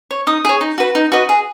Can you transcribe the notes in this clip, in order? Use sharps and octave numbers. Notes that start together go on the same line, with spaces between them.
C#5
D#4 D#6
G#4 C#5
D#4
F#4 B4
D#4
F#4 B4 D#5
G#4